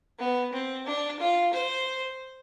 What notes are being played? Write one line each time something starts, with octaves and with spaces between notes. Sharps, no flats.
B3
C4
D4
F4
C5